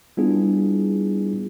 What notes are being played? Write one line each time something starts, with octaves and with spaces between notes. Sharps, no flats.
G3 B3 D4 E4 F4 G#4